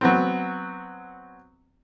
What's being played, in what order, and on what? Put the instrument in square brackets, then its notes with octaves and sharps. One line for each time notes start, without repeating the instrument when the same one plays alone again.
[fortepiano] F#3 B3 C4